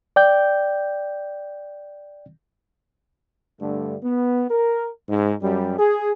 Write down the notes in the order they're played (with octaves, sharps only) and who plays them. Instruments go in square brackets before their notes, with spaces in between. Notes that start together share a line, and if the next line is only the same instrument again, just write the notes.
[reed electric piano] D5 G5 G6
[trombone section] G2 D3 A3
B3
A#4
G#2
F#2 G3
G#4